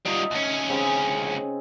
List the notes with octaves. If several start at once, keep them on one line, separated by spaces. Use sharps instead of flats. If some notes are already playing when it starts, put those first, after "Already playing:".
G3 D#4 F4 E5
D2 C#4
C#3 C4 G#4